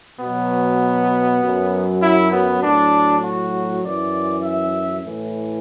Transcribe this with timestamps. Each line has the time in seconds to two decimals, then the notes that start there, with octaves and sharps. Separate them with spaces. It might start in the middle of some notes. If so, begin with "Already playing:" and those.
0.21 B2 F#3 B3
1.41 F#2 F#3
2.02 E4
2.32 B3
2.62 A2 F#3 D4
3.23 F#4
3.83 F#2 E3 D5
4.43 E5
5.04 A2 E3